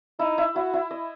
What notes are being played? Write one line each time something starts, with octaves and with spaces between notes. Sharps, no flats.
D#4 E4
E4
E4 F#4
E4
D#5